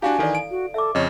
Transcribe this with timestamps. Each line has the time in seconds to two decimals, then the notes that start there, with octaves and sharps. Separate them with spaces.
0.02 D4 E4 F#4 G4 F5 G#5
0.19 D#3 E3 A4 D5
0.35 D7
0.51 F#4
0.74 A4 E5 D6
0.95 F2 C#3 C#5 D#5